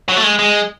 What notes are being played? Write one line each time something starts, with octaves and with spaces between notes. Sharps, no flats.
F#3
A3
G#3
G#3